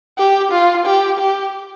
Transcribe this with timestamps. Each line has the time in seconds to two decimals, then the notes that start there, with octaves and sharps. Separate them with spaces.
0.18 G4
0.52 F4
0.86 G4
1.19 G4